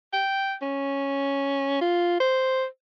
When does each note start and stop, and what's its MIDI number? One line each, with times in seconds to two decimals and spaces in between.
0.14 0.54 79
0.62 1.78 61
1.81 2.18 65
2.20 2.66 72